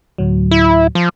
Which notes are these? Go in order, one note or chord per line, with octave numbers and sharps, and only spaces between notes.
D2 A2 F#3
E4
F3